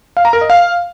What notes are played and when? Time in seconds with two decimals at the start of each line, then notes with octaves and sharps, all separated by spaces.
0.17 F5
0.25 A#5
0.33 A#4
0.41 D#5
0.50 F5